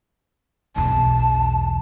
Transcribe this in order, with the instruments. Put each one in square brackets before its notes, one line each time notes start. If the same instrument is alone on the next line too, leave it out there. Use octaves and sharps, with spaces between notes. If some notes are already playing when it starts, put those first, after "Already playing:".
[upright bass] B1 E2 [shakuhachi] A5